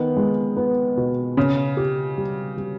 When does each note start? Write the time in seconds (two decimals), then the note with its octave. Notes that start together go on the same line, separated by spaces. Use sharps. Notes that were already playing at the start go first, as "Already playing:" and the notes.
Already playing: D#3 B3
0.17 G#3
0.57 B3
0.97 B2
1.37 C#3 C#4
1.77 G4
2.18 G3
2.57 G3